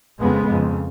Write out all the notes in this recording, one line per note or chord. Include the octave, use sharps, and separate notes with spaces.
F2 C#3 G#3 B3
F2 C#3